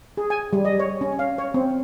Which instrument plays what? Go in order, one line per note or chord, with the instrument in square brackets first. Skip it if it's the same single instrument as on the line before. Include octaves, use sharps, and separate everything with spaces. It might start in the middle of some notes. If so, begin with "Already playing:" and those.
[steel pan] G#4
G#5
G3
D#5
C#5
C#4
F5
C#5
C4